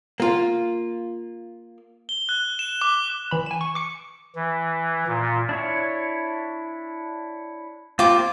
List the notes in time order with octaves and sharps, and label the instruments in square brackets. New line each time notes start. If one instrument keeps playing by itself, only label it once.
[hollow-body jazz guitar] A#3 F4
[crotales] G7
F#6
E7
D6
[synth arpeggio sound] E3 B5
G#5 E7
C#6
D6 C#7
[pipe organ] E3
A#2
[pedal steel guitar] D4 E4 C#5
[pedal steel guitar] A#3 C4 [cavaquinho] F4 D6